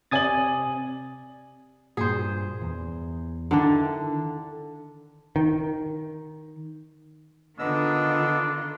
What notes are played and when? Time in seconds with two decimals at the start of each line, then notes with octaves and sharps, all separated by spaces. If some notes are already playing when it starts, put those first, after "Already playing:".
0.11 C3 D5 G#5 D#6 A6 F#7
1.97 G2 A#2 G#4 C5
2.62 E2
3.51 D3 D#3 D4 E4 A#4
5.36 D#3
7.59 D3 D#3 B3 D4 F4 D#5 E6